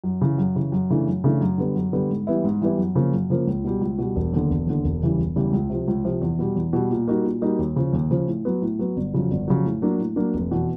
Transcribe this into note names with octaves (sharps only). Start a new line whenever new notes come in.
F#2
C#3 E3
F#2
C#3 E3
F#2
C#3 E3 A3 D4
F#2
C#3 E3 A3 D4
F#2
D3 G3 B3
F#2
D3 G3 B3
G#2
E3 G3 B3 E4
G#2
E3 G3 B3 E4
F#2
C#3 F3 A#3
F#2
C#3 F3 A#3
C#2
B2 G3
C#2
B2 G3
E1
D#2 D3
E1
D#2 D3
E1
E2 C#3 E3 G3
E1
E2 C#3 E3 G3
C#2
C3 F3
C#2
C3 F3
E2
B2 G3
E2
B2 G3
A#2
G3 A#3 D#4 F#4
A#2
G3 A#3 D#4 F#4
D#2
C#3 F3
D#2
C#3 F3
A2
F#3 B3
A2
F#3 B3
G1
F2 C#3 F#3
G1
F2 C#3 F#3
A2
F#3 A#3 D4
A2
F#3 A#3 D4
F1
E2 B2